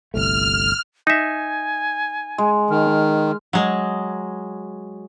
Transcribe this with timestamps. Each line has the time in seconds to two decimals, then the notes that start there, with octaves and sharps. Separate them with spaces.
0.14 G1 C2 A3 F6
1.07 D#4 E5 G#5
2.38 G#3
2.70 D#3 F6
3.53 F#3 G#3